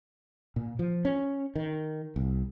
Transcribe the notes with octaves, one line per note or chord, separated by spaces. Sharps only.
A#2
F3
C#4
D#3
C2